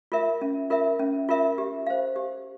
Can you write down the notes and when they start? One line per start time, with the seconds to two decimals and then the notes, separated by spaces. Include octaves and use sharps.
0.12 F4 A#4 E5
0.42 C#4
0.70 F4 A#4 E5
0.99 C#4
1.29 F4 A#4 E5
1.58 G4
1.87 C5 F5
2.16 G4